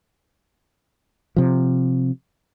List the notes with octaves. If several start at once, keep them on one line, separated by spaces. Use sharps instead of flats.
C3 F3